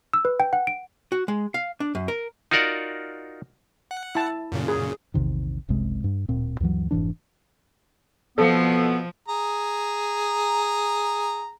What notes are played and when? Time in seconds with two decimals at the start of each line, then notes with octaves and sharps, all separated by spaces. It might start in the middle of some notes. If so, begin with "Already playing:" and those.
0.13 E6
0.25 B4
0.40 G5
0.53 F#5
0.67 D7
1.12 F#4
1.28 G#3
1.54 F5
1.80 D4
1.95 F#2
2.08 A#4
2.51 D#4 F4 F#4 A#4 D5 F#5
3.91 F#5
4.15 E4 A5
4.52 F#2 A#2 C#3
4.68 G#4
5.14 A#1 E2 C3 D#3
5.69 F#1 C2 C3 G#3
6.04 G2
6.29 D1 A#2 C4
6.60 D2 G2 E3 F#3
6.91 F1 G#2 E3 D4
8.38 F2 B2 F3 B3 A4
9.28 G#4 A#5